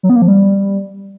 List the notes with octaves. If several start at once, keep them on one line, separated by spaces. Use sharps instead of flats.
F#3
B3
A#3
F3
G3